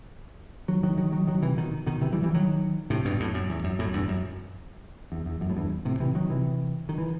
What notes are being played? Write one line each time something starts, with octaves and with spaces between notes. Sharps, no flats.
D#3 F#3
D#3 F#3
D#3 F#3
D#3 F#3
D#3 F#3
C3 E3
B2 D#3
B2 D#3
C3 E3
E3 G3
E3 G3
D#3 F#3
A2 C3
G2 B2
F#2 A2
F#2
E2
F#2
F#2 A2
E2 G2
F#2
E2
E2
F#2
A2
E2 G2
A2 C3
C3 E3
D#3 F#3
C3 E3
D#3
E3